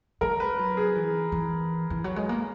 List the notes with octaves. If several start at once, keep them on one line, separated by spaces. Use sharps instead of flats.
G#3 A#4
B4
F#3
G#4
E3
E3
E3
F#3
G#3
A#3